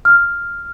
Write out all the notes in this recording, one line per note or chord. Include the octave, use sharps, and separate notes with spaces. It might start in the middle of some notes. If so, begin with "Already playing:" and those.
F6